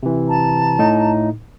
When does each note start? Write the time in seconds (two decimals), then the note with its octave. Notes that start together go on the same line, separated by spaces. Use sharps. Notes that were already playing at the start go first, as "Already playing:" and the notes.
0.03 C3 E3
0.28 A5 A#5
0.79 A2 D#4